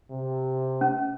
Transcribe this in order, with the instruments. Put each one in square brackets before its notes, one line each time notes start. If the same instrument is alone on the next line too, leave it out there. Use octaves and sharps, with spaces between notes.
[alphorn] C3
[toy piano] C#4